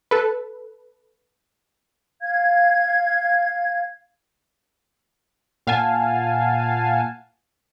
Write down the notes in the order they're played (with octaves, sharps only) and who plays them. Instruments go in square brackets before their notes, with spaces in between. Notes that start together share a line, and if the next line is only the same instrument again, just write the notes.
[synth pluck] A4 B4
[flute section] F5 G#6
[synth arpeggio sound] A#2 F5 F#5 G#5 A5